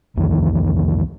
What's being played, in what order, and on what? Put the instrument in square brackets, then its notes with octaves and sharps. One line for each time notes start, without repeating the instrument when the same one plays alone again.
[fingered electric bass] C2 F2 D#3 E3